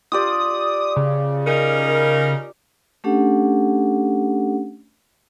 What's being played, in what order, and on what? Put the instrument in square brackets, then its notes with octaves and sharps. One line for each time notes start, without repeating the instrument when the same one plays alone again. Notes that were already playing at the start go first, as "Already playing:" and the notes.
[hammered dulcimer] F4 G4 D5 [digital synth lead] D#6
[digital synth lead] C#3
[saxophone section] C#4 D#4 A#4
[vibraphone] A3 C#4 D4 G4 A4 F#5